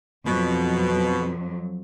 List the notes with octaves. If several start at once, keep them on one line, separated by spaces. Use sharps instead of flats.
F2 B2 F#3